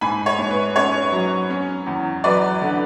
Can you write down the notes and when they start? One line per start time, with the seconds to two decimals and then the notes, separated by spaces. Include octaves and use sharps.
0.01 G#2 G#5 B5
0.26 C#5
0.39 G#2
0.50 B4
0.76 C#4 C#5
1.12 F#3
1.50 C#4
1.86 E2
2.24 F#3 B4 D5
2.62 D3